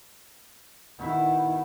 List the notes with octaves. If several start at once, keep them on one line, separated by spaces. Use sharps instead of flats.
B2 D#3 E4 E5